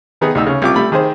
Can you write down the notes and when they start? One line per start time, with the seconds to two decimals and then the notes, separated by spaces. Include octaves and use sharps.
0.21 D#3 B3 D#4 G#4
0.35 D2 D#4 E6
0.47 C#3 C#4
0.62 C2 F4 D6
0.76 G3 A3 B5
0.92 D#3 G#4 C5